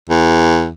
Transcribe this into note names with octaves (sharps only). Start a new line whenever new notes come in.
E2